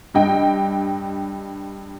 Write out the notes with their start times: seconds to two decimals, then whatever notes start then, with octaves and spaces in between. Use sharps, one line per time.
0.14 G2 D#5 G5